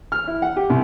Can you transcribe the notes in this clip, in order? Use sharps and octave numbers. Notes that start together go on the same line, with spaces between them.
F6
E4
F#5
G4
C2